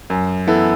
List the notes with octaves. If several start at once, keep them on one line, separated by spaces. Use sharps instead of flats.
F#2
E3 B3 E4 A4